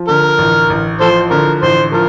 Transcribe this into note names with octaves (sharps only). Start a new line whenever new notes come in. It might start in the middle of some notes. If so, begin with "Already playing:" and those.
Already playing: F3
D3 A#4
A1
A1
F3 A4 C5
D3 A#4
A1 C5
F3 A#4